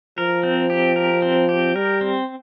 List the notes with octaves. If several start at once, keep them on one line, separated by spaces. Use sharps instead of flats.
F3 A#4
C4
G4
A#4
C4
G4
G3 A#4
C4